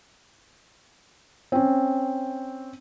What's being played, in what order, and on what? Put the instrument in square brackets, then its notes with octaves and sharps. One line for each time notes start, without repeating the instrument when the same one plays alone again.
[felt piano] C4 C#4